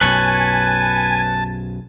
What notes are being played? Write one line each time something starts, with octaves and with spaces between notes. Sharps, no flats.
B1 F#2 B2 B4 C#5 G#5 A5